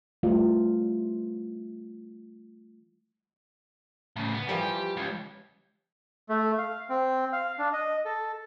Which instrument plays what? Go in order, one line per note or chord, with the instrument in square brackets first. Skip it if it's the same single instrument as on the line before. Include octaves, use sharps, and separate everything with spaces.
[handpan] E3 G3 A3 F4
[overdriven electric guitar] A2 C#3
B3
[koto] E3 F3 G3 [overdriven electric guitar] G4
[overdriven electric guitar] C#2
[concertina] A3
F5
C4
F5
D4
D#5
A4